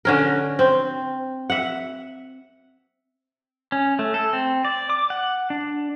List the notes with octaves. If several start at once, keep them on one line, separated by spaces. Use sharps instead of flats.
D3 C#4 A#4
C4
E5 F#5
C#4
A3
A4
C4
D5
D6
F#5
D4